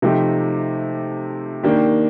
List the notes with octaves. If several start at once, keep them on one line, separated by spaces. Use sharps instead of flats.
C3 F3 A3 D#4 G4
D#3 A#3 D4 G4